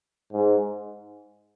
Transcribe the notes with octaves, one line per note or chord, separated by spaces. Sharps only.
G#2